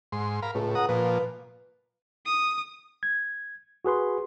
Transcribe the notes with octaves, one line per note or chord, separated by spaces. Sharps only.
G#2 C6
A#4 F5 B5
C#2 A2
F#5 A#5 D#6
A#2 F3 B4
D#6
G#6
F#4 G#4 B4 C6